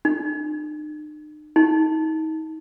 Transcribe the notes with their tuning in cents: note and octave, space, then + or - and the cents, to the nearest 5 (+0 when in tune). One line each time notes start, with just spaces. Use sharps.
D#4 -45
D#4 +30